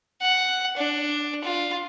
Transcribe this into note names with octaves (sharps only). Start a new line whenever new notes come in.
F#5
D4
F4